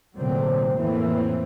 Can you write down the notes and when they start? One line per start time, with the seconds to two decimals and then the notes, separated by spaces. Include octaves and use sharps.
0.14 F1 A#2 D3 F#3 C4
0.76 F2 A2 E3 A#3 C4